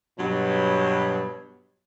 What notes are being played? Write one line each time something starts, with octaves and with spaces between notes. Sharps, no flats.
G2 B2 F#3